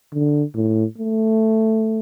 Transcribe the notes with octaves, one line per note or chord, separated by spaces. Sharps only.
D3
A2
A3